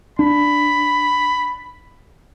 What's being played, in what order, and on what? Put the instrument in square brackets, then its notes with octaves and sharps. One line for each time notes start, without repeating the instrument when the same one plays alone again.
[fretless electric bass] D4 [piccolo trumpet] B5